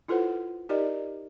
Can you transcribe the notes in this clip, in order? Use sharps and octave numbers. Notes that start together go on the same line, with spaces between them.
E4 F4 A4 B4 C5 F#5
D#4 G4 A#4 D5 D#5